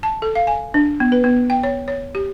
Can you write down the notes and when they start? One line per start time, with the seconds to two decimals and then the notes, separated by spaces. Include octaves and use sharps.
0.03 A5
0.22 A4
0.35 F5
0.47 G#5
0.74 D4
1.00 B3
1.12 B4
1.24 B3
1.50 G5
1.63 C#5
1.88 C#5
2.15 G4